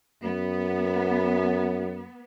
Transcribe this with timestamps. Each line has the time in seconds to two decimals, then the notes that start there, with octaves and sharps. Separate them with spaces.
0.24 F#2 B3